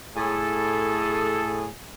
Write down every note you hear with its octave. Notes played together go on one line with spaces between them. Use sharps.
A2 G#4 A4